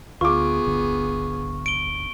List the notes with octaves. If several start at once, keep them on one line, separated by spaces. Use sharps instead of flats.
D2 B3 F4 G#4 C#6 D6
D1 G1 D3
D7 G7